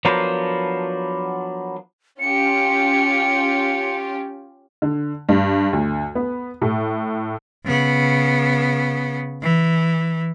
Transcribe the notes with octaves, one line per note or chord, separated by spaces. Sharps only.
F3 F#3 B3 D4 A#4 C5
C#4 F4 G4 C#7
D3
G2
D2
B3
A2
C#3 B3
E3